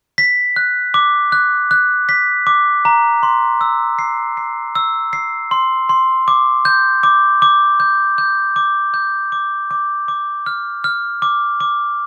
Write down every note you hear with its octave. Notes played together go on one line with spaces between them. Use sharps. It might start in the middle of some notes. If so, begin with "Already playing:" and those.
B6
F#6
D6
F#6
F#6
B6
D6
A#5
C6
E6
C7
C7
E6
C7
C6
C6
D6
G6
D6
D6
G6
G6
D6
G6
D6
D6
D6
F6
F6
D6
D6